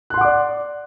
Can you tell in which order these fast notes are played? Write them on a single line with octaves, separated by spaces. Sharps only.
F#6 C6 F#5 D6 D5